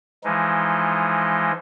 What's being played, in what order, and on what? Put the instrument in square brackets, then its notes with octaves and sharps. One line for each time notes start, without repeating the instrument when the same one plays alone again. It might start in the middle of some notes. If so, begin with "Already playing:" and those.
[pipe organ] E3 F3 G#3 D#4